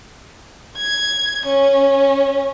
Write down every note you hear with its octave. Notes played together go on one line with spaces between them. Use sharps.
G#6
C#4